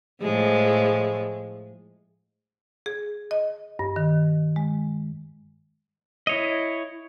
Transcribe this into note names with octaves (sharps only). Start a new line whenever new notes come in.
A2 F3 G#3
G#4
D#5
G2
D#3
G#3
E4 C#5 D#5